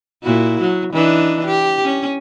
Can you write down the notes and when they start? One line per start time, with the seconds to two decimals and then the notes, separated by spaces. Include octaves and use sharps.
0.24 A#2 E4 F#4
0.61 F#3
0.93 E3 D4 D#4
1.47 G4
1.84 C#4